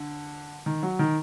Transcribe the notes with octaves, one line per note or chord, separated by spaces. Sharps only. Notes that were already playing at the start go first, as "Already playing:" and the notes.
Already playing: D3
D#3
F#3
D#3